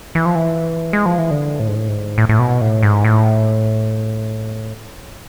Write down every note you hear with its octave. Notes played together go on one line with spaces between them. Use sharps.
E3
F3
E3
G#3
F3
E3
D3
A2
G#2
A2
G#2
A2
A2
B2
A2
G#2
A2